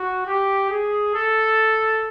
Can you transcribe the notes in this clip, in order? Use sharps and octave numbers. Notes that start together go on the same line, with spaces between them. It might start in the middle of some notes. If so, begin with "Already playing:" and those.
Already playing: F#4
G4
G#4
A4